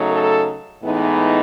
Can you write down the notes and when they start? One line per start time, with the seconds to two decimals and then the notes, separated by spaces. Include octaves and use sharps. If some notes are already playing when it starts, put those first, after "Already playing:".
Already playing: C#3 F#3 A3 D#4
0.12 A4
0.83 A2 E3 G#3 B3 D#4